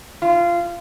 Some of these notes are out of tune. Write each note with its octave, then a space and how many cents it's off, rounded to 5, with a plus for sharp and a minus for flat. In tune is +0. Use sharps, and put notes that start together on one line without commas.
F4 -20